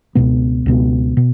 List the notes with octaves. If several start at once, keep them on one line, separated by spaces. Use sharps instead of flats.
C#2 B2 B3
C#2 B2 B3
B2